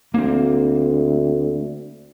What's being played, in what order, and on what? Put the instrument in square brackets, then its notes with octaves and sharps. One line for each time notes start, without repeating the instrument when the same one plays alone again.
[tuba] D2 [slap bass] A#3 C4